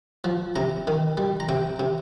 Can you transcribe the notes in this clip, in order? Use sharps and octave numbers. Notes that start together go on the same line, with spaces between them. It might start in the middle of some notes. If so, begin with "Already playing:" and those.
F3
C3 A#5
D#3
G3
A#5
C3 G5
C3